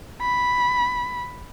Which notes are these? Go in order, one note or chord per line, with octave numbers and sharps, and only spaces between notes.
B5